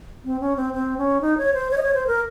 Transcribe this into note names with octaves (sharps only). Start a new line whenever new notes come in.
C4
C#4
C4
C4
C#4
D#4
C#5
C5
C#5
D#5
C#5
C5
A#4